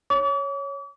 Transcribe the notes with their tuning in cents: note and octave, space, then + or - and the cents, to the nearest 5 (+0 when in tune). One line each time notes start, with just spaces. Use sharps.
C#5 +0 D6 -40